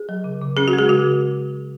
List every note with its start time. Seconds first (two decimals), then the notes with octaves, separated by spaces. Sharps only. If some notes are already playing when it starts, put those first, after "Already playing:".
Already playing: G#4
0.09 F#3
0.24 C#3
0.41 C#3
0.57 C#4 G#4
0.68 F#4
0.73 G#3
0.78 G#4
0.89 C#3 F#4
1.05 C#3